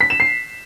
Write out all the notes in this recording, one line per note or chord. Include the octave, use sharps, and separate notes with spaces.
B6
E7
C7